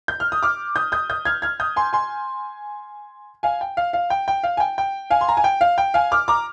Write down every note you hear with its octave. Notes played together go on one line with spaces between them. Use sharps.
G6
F6
D#6
D6 F6
D#6 G6
D#6 G6
D#6 G6
F6 G#6
F6 G#6
D#6 G6
G#5 C6
G#5 C6
F5 G#5
G5
F5
F5
G5
G5
F5
G#5
G5
G5
F5 G#5
C6
A#5
G#5
G5
F5
G5
F5 G#5
D6 F6
A#5 D6